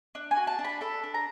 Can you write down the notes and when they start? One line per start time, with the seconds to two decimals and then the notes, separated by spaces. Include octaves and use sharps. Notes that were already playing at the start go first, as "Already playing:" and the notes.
0.15 D4
0.31 G#5
0.36 F#4
0.47 A5
0.59 D4
0.64 B5
0.81 A4 B5
1.04 D4
1.14 A#5